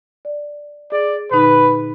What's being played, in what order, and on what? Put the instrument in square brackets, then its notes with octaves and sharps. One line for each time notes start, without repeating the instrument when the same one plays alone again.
[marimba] D5
[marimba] G#4 [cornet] D5
[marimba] A#2 D3 D#4 [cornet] B4